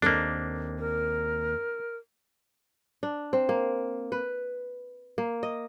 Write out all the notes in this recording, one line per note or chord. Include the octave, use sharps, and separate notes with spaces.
D#2 A#3 C4 D4 A4
A#4
D4
C4
A#3
B4
A#3
D#5